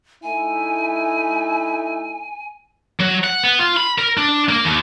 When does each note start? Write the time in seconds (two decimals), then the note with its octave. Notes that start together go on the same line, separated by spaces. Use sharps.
0.23 A3 D#4 E4 G#5
3.00 F#3
3.24 F#5
3.43 B3
3.59 F4
3.77 B5
3.98 A#4
4.17 D4
4.49 A#3
4.64 D#2